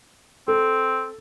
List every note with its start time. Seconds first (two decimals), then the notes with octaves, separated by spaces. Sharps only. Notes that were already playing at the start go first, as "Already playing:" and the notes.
0.48 C4 A4